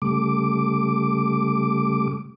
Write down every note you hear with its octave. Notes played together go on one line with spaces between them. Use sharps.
C#3 G3 A3 D6